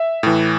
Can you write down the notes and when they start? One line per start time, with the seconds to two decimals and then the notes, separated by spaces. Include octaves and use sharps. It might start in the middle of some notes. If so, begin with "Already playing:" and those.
Already playing: E5
0.23 A2 E3